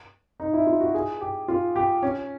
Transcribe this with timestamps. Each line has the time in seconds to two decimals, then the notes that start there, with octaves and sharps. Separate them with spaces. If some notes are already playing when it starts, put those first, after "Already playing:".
0.40 D#4
0.53 E4
0.67 F4
0.81 F#4
0.94 G#4
1.21 G4
1.48 F4
1.76 G4
2.02 C#4